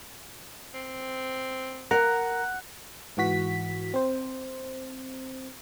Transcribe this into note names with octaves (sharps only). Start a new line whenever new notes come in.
C4
A#4 F#5 A#5
G#2 E3 F#4 B6
C4 C5